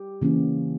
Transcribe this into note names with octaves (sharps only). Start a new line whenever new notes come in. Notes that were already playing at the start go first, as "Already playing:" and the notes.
Already playing: G4
C#3 E3 A#3 C#4